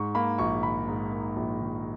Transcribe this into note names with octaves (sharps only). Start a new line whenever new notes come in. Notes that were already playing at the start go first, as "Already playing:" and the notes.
Already playing: G#2 C#6
A#3 B5
A#1 C#6
D#3 B5
G#2
A#3
A#1
D#3